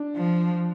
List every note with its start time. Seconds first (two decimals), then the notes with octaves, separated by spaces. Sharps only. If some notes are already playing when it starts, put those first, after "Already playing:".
Already playing: D4
0.16 F3